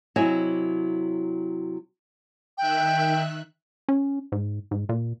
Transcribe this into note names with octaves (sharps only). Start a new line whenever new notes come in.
C3 F#3 E4 D#5 E5 G#5
D#3 E5 G5 F#6
C#4
G#2
G#2
A#2